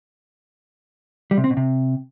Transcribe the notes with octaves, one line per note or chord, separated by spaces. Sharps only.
G3
C3
C4
B2
C3